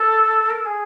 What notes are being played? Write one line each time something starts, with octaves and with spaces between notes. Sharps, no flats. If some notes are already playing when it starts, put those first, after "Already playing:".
Already playing: A4
A#4
A4
G#4